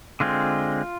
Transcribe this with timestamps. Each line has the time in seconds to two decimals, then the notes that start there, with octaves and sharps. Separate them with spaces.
0.20 D3 G#3 C4 F4